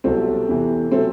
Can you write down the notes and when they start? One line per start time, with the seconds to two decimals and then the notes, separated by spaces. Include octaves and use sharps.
0.04 C2 B2 F#3 A3 C4
0.48 E2 C3 E3
0.92 B2 F#3 A3 C4